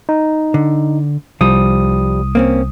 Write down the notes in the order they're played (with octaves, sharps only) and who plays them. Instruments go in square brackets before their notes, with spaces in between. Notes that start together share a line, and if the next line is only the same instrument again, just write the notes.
[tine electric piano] D#4
[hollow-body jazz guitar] D3
[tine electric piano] C2 D#6 [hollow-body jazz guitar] F3 G3
[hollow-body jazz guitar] A#3 C4 C#4